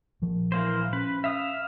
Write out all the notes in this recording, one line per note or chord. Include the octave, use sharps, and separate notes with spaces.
A#2 F3
E3 A#3 C5
C#4 B4
E5 F5 D#6